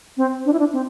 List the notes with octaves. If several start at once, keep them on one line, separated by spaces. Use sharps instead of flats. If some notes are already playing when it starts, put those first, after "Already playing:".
C4
D4
E4
D4
C4